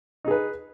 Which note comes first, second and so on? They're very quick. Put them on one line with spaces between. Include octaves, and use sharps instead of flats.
D#4 G#4 B4